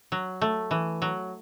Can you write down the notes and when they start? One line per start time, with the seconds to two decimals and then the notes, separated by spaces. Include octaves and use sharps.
0.12 F#3
0.42 A3
0.71 E3
1.02 F#3